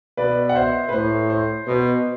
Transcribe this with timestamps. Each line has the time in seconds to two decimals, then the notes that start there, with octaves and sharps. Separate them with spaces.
0.17 B2 B4 D5
0.49 F#5
0.55 C5 E5
0.89 B4
0.93 A2 C5
1.30 C5
1.67 B2 C5